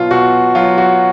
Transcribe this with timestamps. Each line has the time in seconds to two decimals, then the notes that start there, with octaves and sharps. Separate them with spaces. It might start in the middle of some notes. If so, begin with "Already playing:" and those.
Already playing: B2 F#3 F4
0.11 B2 F#4
0.55 F#3 F4
0.78 F#4